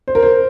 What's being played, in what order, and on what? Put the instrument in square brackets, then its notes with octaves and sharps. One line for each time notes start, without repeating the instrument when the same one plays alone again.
[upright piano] C5
A#4
C5